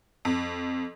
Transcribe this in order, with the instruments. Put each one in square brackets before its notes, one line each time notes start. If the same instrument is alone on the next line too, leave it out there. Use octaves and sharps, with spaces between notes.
[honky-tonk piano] F2